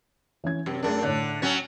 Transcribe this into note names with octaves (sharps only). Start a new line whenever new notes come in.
E3 C#4 G#6
F#2 C3
F#2 A3 D4 G#4 A#4
A2 D3 C#5 F#6
F#3 C#4